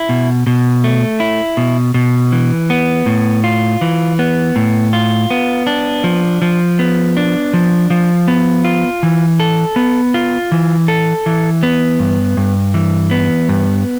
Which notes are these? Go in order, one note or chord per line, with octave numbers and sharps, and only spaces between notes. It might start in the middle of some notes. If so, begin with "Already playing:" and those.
Already playing: E4
B2
B2
A3
E4
B2
B2
E3
B3
A2
F4
E3
B3
A2
F4
B3
D4
F3
F3
B3
D4
F3
F3
B3
F4
E3
A4
B3
F4
E3
A4
E3
B3
G2
G2
E3
B3
G2